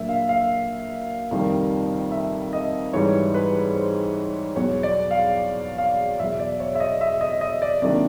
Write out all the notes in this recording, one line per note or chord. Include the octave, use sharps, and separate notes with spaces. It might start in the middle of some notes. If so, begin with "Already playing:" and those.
Already playing: A#2 F#3 A#3 D4 E5
F5
F5
F2 C3 D#3 G3
E5
D#5
G#2 E3 G3 C#5
B4
C5
E2 B2 F#3 C#5
D5
F5
F5
E2 B2 F#3 E5
D5
C#5
E5
D#5
E5
D#5
D#5
D5
C3 D#3 F#3 A#3 D4 D5